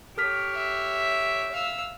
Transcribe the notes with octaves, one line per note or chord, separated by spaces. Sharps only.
G4 A4 C#5 F6 B6
E5
F5 E6